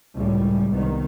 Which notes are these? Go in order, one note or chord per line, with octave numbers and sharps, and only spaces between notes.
C#2 F#2 A2 G3
C2 D#3 B3